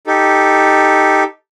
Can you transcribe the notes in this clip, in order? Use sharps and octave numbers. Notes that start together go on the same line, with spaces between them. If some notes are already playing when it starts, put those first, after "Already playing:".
D#4 G4 A4